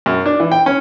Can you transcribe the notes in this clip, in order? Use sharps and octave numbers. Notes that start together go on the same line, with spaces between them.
F#2
D4
E3
G5
C#4